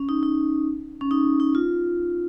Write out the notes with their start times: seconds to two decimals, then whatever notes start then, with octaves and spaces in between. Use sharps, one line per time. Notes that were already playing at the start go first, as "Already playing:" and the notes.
Already playing: C#4
0.09 D#4
0.23 D#4
1.01 C#4
1.11 D#4
1.40 D#4
1.55 F4